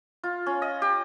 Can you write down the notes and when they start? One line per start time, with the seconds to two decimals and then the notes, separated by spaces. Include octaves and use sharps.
0.24 F4
0.46 C#4
0.62 D#5
0.82 G4